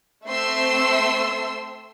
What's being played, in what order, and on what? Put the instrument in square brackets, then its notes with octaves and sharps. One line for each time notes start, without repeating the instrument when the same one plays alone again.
[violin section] A3 C4 E5 C6 E6 C7